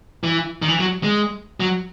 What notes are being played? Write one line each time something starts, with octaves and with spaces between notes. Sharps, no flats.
E3
D#3
E3
F#3
G#3
F#3